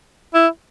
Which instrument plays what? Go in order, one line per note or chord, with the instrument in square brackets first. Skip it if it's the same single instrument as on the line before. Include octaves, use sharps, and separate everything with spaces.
[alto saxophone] E4